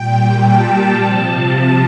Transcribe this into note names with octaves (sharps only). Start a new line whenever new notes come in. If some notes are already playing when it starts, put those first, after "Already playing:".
Already playing: A#2 G3 G5
A5
C3 F3
A5